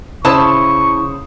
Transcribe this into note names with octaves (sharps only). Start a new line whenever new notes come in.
C#3 E4 C5 A5 C#6 D#6